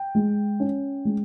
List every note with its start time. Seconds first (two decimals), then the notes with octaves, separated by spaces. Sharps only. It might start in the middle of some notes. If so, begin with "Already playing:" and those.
Already playing: G5
0.15 G#3
0.60 C#4
1.05 G#3